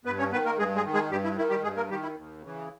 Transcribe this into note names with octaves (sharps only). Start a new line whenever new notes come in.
G2 B3 B4
C#4 C#5
D#3 B3 B4
A#3 A#4
G2 G#3 G#4
G#3 G#4
D#3
G#3 G#4
G2 G3 G4
E4
D#3 E4
G3 G4
G2 G#3 G#4
A#3 A#4
D#3 G3 G4
E4
D#2
C#3 E3